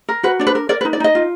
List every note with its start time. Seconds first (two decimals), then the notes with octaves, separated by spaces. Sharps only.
0.09 A#4
0.23 F#4 B4
0.40 D4 D5
0.47 B4
0.55 A#4
0.69 A#4 D5
0.81 B4
0.85 D#4
0.93 D5
1.00 D#4 D#5
1.15 F4